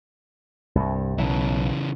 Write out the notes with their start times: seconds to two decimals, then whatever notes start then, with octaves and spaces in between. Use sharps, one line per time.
0.75 C2 G2
1.18 B1 C#3 E3